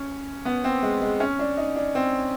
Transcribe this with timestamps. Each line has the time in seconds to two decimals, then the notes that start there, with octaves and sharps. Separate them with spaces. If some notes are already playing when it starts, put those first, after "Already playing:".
Already playing: C#4
0.45 B3
0.64 C4
0.82 G#3
1.02 G#3
1.20 C#4
1.39 D4
1.57 D#4
1.76 D4
1.95 C4